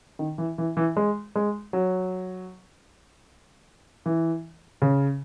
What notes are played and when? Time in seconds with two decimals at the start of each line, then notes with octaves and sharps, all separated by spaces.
0.19 D#3
0.38 E3
0.58 E3
0.77 E3
0.97 G#3
1.35 G#3
1.73 F#3
4.06 E3
4.82 C#3